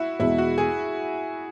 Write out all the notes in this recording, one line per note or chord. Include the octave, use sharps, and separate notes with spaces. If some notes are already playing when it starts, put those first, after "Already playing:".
Already playing: E4 F#4
E2 B2 G#3 E4
F#4
G#4